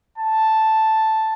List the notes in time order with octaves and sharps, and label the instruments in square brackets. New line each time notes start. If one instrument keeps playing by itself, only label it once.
[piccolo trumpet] A5